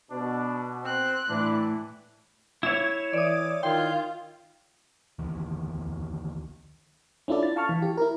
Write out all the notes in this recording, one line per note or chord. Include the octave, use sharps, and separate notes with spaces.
B2 D4
C4 C6 F#6
A2 E3 D4
E4 C#5 E7
E3 D5 D#6
D#3 F4 G5 C6
D2 D#3 E3
C#4 D4 E4 F4 A4 D5
A6
F5 A5 C#6 F6
E3
G4
E4 A#4